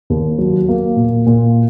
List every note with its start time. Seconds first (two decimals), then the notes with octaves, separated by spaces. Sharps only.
0.10 D#2
0.38 F#3
0.68 A#3
0.96 A#2
1.27 A#2